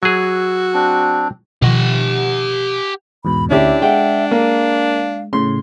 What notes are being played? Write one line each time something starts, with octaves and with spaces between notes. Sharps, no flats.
F#3 F#4 G#4 E6
C4 D4
B2 D#3 F3 G4 F#5
E2 G#2 B2 B5
D2 C#4 D4 E4 G4 E5
G#3 E5 F#5 G5
A#3 F5
A2 C#3 C6